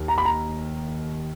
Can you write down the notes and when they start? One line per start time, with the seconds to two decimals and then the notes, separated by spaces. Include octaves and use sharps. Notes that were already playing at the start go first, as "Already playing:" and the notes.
Already playing: D#2 D#3
0.08 A#5
0.18 B5
0.25 A#5